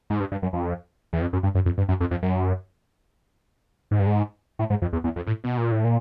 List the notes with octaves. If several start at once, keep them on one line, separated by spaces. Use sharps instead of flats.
G#2
G2
G2
F#2
F2
E2
F2
F#2
G2
F#2
F2
G2
F#2
F2
F2
F#2
G#2
G2
G#2
A2
G#2
F2
E2
E2
F2
A2
B2
A#2
A2
A#2